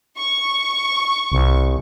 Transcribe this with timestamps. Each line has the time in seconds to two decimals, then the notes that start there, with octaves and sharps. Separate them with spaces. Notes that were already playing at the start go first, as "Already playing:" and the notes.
0.17 C#6
1.32 C2